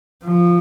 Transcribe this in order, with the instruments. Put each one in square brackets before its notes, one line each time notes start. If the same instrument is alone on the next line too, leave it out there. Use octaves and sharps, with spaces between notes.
[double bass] F3